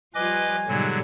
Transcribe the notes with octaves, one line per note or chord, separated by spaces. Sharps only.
F3 G3 F4 B4 D#5 G#5 D6
G#2 B2 D3 F#3 G3